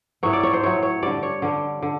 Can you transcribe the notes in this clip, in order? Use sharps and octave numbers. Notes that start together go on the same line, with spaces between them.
A2 F#3 C#5
D5
C#5
C5
A2 F#3 C#5
C#5
D3 G3 D5
C#5
D3 G3
D3